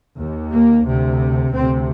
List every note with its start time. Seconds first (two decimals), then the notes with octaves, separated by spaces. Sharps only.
0.19 D#2
0.52 A#3
0.86 D2 C3
1.54 D2 C3 C4